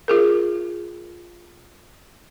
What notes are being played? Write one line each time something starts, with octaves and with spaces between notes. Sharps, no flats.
F4 G#4 A#4